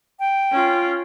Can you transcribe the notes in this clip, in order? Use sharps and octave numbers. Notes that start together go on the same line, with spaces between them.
G5
C#4 F4